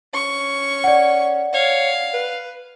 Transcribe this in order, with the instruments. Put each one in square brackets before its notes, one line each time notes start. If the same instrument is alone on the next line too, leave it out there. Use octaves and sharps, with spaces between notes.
[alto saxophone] C#4 [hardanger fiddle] C#6
[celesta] D5 F#5
[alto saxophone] C#5 [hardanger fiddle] F5
[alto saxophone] B4